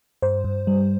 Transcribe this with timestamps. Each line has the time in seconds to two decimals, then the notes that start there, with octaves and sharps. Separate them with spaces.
0.22 G2 C5
0.44 G2
0.67 G3